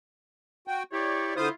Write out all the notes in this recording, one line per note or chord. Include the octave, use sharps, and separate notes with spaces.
F#4 G5
E4 G4 C#5 D5
D3 E4 F4 C5 D#6